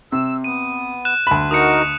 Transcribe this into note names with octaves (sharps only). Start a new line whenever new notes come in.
C3 E6
B3 D#7
F#6 E7
D2 B5
D#4 F#4 A#4 D#6 C#7